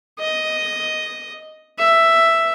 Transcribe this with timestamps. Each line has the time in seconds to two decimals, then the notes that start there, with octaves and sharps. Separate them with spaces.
0.19 D#5
1.79 E5